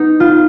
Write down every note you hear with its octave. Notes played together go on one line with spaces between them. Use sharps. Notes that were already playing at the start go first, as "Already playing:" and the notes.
Already playing: B3 D#4
F4